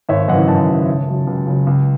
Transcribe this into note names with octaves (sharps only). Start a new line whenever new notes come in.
G#1 C#5 E5
F#2 C#3 E3 D#5 F#5
G#1 F#5 A5
F#2 C#3 E3
C#2
C#3 F#3
C#2
C#3 F#3
C#2